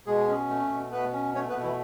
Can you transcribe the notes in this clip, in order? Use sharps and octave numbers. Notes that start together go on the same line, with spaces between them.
B2 G#3 G#4
C#4
A3
B2
B2 B3 B4
C#4
A3 C#4 C#5
B3 B4
B2
E3 E4